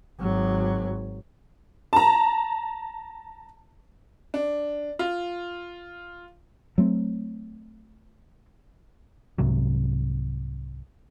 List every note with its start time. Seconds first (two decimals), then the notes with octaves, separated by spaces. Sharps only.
0.20 G#1 F#3
1.93 A5 A#5
4.34 D4
4.99 F4
6.78 F#3 A3 C4
9.38 C2 G#2 C3 F#3